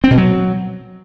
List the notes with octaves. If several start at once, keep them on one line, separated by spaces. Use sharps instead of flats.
C4
B2
F#3